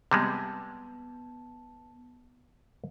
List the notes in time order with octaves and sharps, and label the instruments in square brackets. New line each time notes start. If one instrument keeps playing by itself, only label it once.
[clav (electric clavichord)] C3 G3 G#3 [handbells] B3 A5